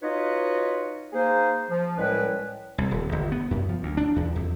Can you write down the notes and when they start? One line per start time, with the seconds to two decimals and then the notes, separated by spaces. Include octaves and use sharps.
0.02 D#4 F4 F#4 B4 C#5 D#5
1.13 A#3 D#4 G#4 C5
1.70 F3
1.97 C2 A2 G#3 C#4 B4
2.78 C2
2.91 D#1
3.12 G1
3.32 B3
3.51 F#2
3.69 F3
3.83 D2
3.97 D4
4.16 E2
4.36 F2